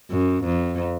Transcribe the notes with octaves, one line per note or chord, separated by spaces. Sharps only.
F#2
F2